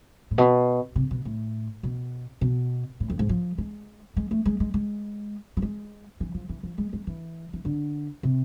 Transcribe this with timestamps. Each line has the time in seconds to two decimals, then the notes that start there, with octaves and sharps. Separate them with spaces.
0.31 A2
0.38 B2
0.96 C3
1.11 B2
1.25 A2
1.83 B2
2.41 B2
3.00 A2
3.10 F2
3.19 G#2
3.29 F3
3.58 G#3
4.17 G#3
4.31 A3
4.46 G#3
4.60 G#3
4.74 G#3
5.57 F3
5.62 G#3
6.20 E3
6.34 F3
6.49 E3
6.63 F3
6.78 G#3
6.93 G#3
7.07 E3
7.53 E3
7.65 D3
8.23 C3